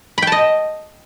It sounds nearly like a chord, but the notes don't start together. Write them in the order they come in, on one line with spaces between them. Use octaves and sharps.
B5 G5 A5 D#5